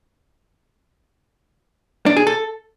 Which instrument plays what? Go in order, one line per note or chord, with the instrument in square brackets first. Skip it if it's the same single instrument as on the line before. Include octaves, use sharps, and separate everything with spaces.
[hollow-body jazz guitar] D4
G#4
A4